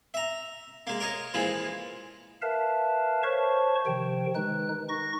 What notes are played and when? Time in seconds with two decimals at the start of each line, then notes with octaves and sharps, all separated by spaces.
0.14 E5 A#5
0.87 G#3 A#3
1.00 A#4 C#5 D#5
1.34 A#2 E3 F3 G#3
2.42 A#4 B4 E5 F5 A5
3.23 C5 C#5 A5 C#6
3.86 C3 D#3 F3 G5
4.35 D#3 G#3 D#4 B4 F#6
4.89 D#4 C#6 A#6